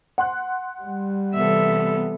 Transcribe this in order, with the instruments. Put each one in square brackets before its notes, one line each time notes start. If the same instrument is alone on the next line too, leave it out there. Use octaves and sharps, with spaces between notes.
[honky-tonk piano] F#5 C6 F#6
[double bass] G3
[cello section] C3 E3 B3 [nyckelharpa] A4 E5